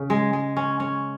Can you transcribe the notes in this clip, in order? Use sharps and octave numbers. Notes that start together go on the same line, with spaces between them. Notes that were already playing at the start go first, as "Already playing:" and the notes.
Already playing: C#3
G#3
G#3
C#4
C#4